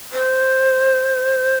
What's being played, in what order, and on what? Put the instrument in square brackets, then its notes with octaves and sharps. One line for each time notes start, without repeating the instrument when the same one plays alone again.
[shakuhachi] C5